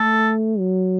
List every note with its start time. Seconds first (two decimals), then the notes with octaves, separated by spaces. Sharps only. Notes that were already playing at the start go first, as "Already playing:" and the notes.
Already playing: A3 A4
0.59 F#3